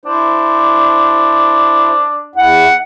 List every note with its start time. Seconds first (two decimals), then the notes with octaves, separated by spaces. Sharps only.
0.05 D4 E4 C5
2.36 E2 E4 F#5